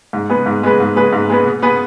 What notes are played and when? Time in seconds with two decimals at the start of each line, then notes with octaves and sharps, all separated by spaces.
0.13 G#2
0.30 G#3 B3 G#4 B4
0.46 G#2
0.63 G#3 B3 G#4 B4
0.80 G#2
0.96 G#3 B3 G#4 B4
1.13 G#2
1.30 G#3 B3 G#4 B4
1.47 B2
1.62 B3 G#4 B4